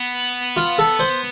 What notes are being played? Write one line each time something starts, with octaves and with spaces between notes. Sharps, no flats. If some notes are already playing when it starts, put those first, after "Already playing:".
Already playing: B3
F4
A4
C5